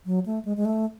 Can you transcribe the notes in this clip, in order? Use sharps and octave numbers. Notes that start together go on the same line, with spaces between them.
F#3
A3
G#3
G#3
A3